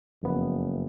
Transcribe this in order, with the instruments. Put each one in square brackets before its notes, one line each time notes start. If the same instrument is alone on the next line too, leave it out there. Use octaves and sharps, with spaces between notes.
[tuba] F#1 [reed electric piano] F2 B3